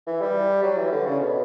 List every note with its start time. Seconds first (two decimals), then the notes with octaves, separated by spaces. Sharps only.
0.07 E3
0.21 G3
0.63 F#3
0.77 E3
0.92 D3
1.06 C#3
1.20 B2